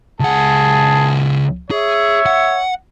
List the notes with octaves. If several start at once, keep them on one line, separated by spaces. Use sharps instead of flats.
C#2 G#4 F#5 A5
G#4 C#5 E5
F#5